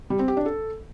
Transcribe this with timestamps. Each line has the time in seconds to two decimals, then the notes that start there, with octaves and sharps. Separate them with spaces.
0.10 G3
0.19 C4
0.28 G4
0.37 D4
0.46 A4